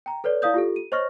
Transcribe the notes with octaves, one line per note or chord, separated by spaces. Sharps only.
G5 A#5
A4 B4 C#5 D5
E4 D5 F5 D#6 G6
F4 G4 A4
D#7
C5 C#5 D#5 C#6 F6 A#6